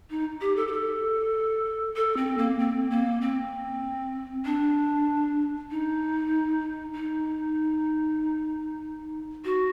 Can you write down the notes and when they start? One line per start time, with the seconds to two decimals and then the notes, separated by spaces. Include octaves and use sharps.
0.10 D#4
0.41 G4
0.56 A4
0.68 G4
0.72 A4
1.96 A4
2.17 C4
2.38 A#3
2.59 C4
2.90 A#3
3.21 C4
4.45 D4
5.71 D#4
6.95 D#4
9.45 F#4